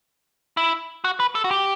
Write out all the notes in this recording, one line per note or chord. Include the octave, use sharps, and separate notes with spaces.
E4
F#4
B4
A4
F#4
G4